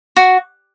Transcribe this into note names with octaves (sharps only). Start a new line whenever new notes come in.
F#4